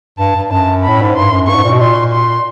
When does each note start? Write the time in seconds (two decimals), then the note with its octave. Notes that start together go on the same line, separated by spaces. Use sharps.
0.18 G2 A5
0.36 G2
0.51 F#2 A5
0.83 A2 B5
1.01 G#2
1.16 G2 C6
1.31 F#2
1.47 G2 C#6
1.55 G#2
1.64 A#2
1.72 B2
1.80 A#2 C6
2.12 C6